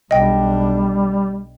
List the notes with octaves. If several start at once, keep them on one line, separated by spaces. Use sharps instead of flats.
B1 G3 D4 D#5 G5